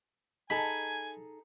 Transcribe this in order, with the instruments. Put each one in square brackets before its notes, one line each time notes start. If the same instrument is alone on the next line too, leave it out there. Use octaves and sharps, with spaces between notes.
[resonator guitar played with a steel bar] D#4 G#4 A4 [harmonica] G#5 [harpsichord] B5